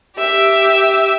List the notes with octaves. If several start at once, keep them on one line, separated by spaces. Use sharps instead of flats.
G4 E5